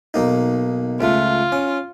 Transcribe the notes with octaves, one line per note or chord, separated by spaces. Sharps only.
B1 A#3 D#4
C#2 A3 F4
C#4